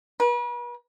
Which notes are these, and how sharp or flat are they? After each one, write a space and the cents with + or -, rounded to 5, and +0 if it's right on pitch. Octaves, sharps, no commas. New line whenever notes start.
B4 -40